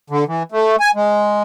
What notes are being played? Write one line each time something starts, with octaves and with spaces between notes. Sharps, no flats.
D3
E3
A3
G#5
G#3